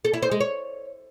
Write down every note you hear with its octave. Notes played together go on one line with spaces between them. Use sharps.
A4
E4
C5
G#3
C#5